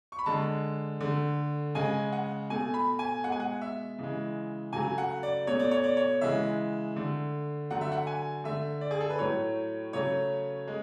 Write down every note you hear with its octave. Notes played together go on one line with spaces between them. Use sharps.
C#6
B5
D3 G#3 A5
D3 A3
C#3 G#3 G#5
F#5
B2 A3 G#5
B5
G#5
B2 G#3 F#5
G#5
F#5
E5
C#3 E3 G#3
C#3 F#3 A3 G#5
F#5
D5
B2 A3 C#5
D5
C#5
D5
C#5
C#3 E3 G#3 E5
D3 A3
D3 F#3 A3 F#5
E5
F#5
G#5
D3 A3 E5
D5
G#4
A4
B4
A2 F#3 A3 C#5
C#3 F#3 A3 C#5
G#3